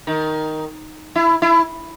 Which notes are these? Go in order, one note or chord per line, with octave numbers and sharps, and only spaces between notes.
D#3
E4
E4